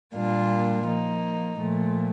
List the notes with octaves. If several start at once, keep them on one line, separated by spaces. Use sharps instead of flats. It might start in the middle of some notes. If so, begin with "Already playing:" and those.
A#2 G3 A#3 D4 F4
F3 A#3 D#4
A#2 F3 A3